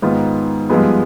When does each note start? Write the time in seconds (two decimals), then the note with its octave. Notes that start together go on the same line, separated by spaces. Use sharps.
0.02 G#2 D#3 B3 F4
0.70 G2 F3 G#3 B3